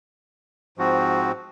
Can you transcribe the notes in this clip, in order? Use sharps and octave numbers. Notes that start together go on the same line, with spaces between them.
G#2 F3 C4 F#4